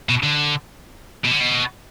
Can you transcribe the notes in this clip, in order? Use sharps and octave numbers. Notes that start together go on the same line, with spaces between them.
B2
D3
B2
D3
B2